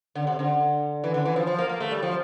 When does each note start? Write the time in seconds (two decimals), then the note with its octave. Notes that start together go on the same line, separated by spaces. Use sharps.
0.15 D3
0.27 C3
0.39 D3
1.04 E3
1.14 D3
1.25 E3
1.36 F3
1.47 F3
1.58 A#3
1.69 A#3
1.80 A3
1.91 G3
2.02 F3